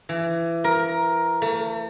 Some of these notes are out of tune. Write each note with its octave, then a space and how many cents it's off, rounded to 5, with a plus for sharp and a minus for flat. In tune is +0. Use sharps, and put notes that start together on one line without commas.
E3 +25
A#4 +10
A3 +40